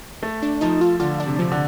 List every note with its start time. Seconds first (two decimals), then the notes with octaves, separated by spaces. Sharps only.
0.23 A3
0.42 D4
0.61 F3 D#4
0.81 F4
1.00 D3 F4
1.20 D4
1.27 C3
1.39 C3 F3
1.52 D3